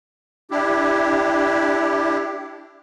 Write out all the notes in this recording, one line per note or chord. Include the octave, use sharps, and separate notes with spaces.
D4 E4 G4